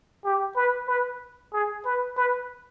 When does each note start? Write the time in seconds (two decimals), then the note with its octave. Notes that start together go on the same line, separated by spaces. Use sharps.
0.25 G4
0.56 B4
0.88 B4
1.53 G#4
1.85 B4
2.17 B4